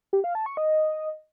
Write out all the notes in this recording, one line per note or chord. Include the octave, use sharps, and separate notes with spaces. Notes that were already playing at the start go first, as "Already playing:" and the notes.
G4
F5
A5
C#6
D#5